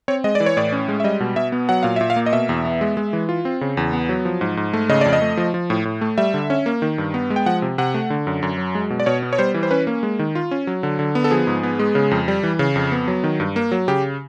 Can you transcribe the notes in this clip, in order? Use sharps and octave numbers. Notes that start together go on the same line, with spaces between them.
C4 C#5
G#3 D#5
D5
E3
C#5
A2 D5
C#4
G#3
E5
G3 D#5
B2
B2 E5
B3
F#3 F#5
A#2 F5
A#2 E5
F5
A#3
D#5
B2 E5
E2
B3
G#3
G#3
E3
F4
C4
C#3
E2
B3
F#3
F3
G#2
G#2
A3
C#3 D#5
F2 D5
D#5
A3
F3
F3
A2
A2
A3
G3 E5
D3
C#4
A#3
D#3
G2
B3
G#3
G5
F3 F#5
C3
C3 F#5
A3
D3
F#2
F#2
F#3
G#3
B2
D5
B2 C#5
B3
C#5
G3 C5
E3
C5
C#4 B4
A#3
G#3
D#3
F4
C#4
F#3
D3
D3
B3
A4
F3 G#4
G#2
B3
G#3
C#3
F2
G3
E3
C#3
F2
B3
F#3
D#3
G2
A#3
F#3
C#3 G4